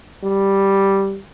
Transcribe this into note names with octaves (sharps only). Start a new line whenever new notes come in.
G3